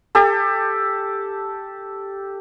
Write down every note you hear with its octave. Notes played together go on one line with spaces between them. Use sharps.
G4 A4